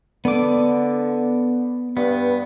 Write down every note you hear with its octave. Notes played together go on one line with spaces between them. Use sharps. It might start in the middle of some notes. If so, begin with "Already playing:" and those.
D3 B3 D6
G2 B3